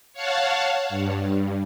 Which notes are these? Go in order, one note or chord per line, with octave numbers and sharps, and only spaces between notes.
C#5 F5 F#5 A5
G2